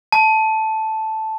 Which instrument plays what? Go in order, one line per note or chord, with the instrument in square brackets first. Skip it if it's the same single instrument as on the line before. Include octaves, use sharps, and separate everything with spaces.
[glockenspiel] A5